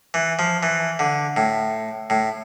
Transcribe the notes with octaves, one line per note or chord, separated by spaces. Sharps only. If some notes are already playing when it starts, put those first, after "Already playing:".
E3
F3
E3
D3
A2
A2